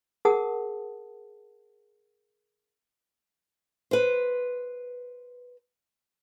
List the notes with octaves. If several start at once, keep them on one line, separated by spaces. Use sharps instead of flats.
G#4 A#4 F#5 A5 D#6
B4 C5